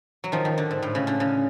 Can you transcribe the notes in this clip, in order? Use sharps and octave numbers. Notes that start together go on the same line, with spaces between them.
F#3
D#3 F3
D#3
D3
G#2
A2
C#3
D3
C#3